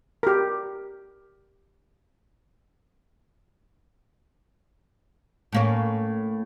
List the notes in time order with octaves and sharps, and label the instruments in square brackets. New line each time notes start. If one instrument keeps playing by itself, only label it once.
[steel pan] G4 A#4
[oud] A2 A#3 C#4